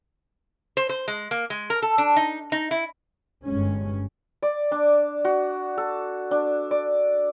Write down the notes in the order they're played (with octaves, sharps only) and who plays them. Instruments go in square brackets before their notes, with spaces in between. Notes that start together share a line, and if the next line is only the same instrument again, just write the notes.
[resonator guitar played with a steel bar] C5
C5
G#3
A#3
G#3
A#4
A4
D4
D#4
D#4
E4
[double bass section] G1 G2 G#3 C#4
[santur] D5
D4
F#4
A4
D4
D5